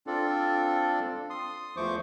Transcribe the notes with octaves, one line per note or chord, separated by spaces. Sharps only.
C4 D4 F4 A4 D5
C6 D#6
E2 F3 A3 C5 C#6 D6